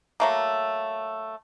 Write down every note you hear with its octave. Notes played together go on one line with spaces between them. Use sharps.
F#3 A3 A#3